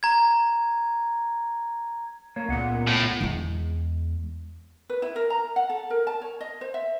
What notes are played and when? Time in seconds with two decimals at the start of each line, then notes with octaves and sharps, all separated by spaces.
0.03 A#5 G#6
2.36 A#3 C#5
2.49 C#2 A#2 B3 F#5
2.87 A2
3.21 E2 G#3
4.90 B4
5.02 E4
5.16 A#4
5.30 A#5
5.56 F#5
5.70 A4
5.90 A#4
6.07 A5
6.22 C#5
6.41 D#5
6.61 C5
6.74 E5